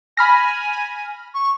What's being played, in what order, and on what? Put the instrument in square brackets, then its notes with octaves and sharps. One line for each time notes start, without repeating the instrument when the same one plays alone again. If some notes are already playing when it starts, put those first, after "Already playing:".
[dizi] G#5 [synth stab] B5 F6 A#6
[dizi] C#6